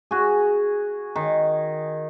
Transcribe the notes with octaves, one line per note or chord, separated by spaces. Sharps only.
F#4 G#4
D#3